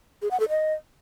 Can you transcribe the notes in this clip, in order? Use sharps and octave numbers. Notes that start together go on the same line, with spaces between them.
G#4
F#5
A4
D#5